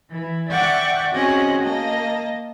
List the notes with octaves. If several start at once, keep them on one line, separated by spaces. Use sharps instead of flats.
E3 E4
D5 E5 F#5 G5 C#6 D6
C4 C#4 F#4 G#4 D#5 F#5
A#3 D#5 A5